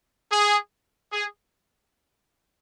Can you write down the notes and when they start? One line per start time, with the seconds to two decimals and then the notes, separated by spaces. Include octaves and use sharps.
0.32 G#4
1.12 G#4